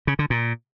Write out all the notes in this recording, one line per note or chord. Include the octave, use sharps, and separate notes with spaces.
C#3
D3
A#2